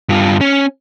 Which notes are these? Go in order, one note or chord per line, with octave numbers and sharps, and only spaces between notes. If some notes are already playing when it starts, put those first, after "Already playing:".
G2 F4
C#4